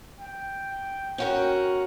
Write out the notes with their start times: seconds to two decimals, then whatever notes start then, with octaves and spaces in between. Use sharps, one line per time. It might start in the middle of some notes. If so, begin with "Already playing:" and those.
0.20 G5
1.18 C#4 F#4 A#4